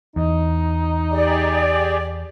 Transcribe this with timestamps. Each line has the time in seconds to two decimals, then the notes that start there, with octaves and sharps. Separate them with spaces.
0.16 E2 D#4
1.11 G4 G#4 D5